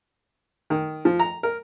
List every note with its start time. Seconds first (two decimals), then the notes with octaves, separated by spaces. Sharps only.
0.70 D#3
1.05 F3
1.19 A#5
1.43 A#4